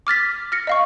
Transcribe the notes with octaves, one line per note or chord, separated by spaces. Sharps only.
D6 F6 A6 B6
F6 A#6 C#7
D#5 F5 C#6